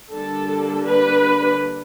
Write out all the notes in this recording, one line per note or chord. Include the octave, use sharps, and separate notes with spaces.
D3 G3 A#3 D4 A4
B4